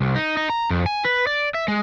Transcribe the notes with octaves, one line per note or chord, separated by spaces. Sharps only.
C2
D#4
D#4
A#5
F2
G#5
B4
D5
E5
G#3